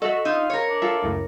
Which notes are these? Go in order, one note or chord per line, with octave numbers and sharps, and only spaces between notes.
F#4 A4 D#5 E5
D#4 F4 E6
A#4 C#5
D4
F4 A4 E5
C#2 F#2 A2